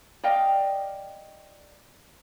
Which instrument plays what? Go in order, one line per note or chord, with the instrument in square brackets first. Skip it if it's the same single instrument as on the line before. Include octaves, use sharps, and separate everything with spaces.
[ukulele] D5 D#5 F5 G5